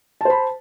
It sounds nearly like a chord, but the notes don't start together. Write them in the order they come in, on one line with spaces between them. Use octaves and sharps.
A5 C5 B5